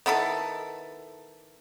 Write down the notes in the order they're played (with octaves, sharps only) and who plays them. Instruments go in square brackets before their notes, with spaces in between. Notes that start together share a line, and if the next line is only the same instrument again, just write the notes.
[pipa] D#3 B3 E4 A4